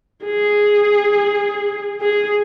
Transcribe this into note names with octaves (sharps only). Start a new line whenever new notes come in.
G#4
G#4